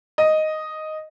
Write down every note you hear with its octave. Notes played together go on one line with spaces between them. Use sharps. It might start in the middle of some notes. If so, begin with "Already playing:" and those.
D#5